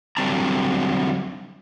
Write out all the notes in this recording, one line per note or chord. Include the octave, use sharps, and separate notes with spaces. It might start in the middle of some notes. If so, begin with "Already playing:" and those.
D3 F#3 G3 C4 A5 A#5